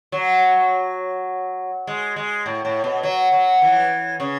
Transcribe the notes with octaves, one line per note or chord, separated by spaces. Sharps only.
F#3
G#3
G#3
A2
A2
B2
F#3
F#3
E3
C#3